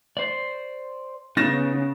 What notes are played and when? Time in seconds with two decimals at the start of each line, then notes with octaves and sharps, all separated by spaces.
0.17 C5 D5
1.37 C#3 B3 D#4 A6 A#6 E7